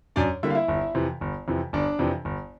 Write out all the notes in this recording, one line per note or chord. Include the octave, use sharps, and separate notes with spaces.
F#2 D4 D5
D3 G3 A#3 E4 E5
F5
E4 E5
G1
F2 C3 E3
G1
F2 C3 E3
G1 D4 D5
F2 C3 E3
G1